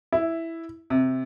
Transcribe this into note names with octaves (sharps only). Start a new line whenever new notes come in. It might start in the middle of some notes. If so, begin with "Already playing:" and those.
E4
C3